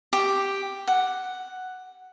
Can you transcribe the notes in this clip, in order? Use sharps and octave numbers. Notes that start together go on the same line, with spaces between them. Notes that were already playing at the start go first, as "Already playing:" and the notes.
G4
F#5